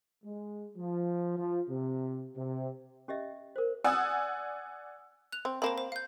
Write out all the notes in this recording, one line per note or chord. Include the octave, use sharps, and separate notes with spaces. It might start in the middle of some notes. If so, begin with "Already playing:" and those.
G#3
F3
F3
C3
C3
C#4 G4 D#5 E5
A#4 C5
D5 F#5 G#5 D#6 E6
F#6 F7
C4
A#3 C4 C5 A5 B5
C5
F5 G6